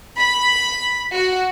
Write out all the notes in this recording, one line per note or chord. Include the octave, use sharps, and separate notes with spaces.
B5
F#4